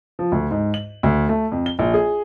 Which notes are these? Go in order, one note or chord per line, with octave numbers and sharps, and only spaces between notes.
F3
D2
G#2
F#7
D2
A3
F2
G7
A#1
G#4